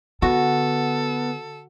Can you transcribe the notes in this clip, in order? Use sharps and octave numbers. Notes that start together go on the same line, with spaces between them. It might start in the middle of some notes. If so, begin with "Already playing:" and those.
D3 B3 F#4 A4